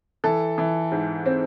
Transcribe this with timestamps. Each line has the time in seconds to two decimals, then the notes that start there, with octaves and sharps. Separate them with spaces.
0.24 E3 A4
0.58 E3
0.92 G#2
1.26 C4